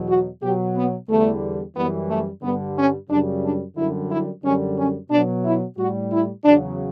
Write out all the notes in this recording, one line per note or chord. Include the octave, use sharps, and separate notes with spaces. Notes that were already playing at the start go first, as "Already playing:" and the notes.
Already playing: E2 B2 F#3
F#4
B2 F#3 G4
B3
E2 D3 G3 A3
F#2 E3 G3 B3
A3
G2 D3 G3 B3
C#4
F#2 C#3 G3 D4
D4
F#2 D3 G3 E4
E4
F#2 D3 G3 C#4
C#4
B2 F#3 D4
E4
A2 G3 F#4
E4
E2 C#3 F#3 D4